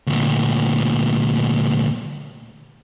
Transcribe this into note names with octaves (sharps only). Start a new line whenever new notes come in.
D2 A#2